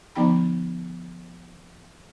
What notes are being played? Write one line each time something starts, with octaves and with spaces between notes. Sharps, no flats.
D3 F3 B3 D#4 G5 B5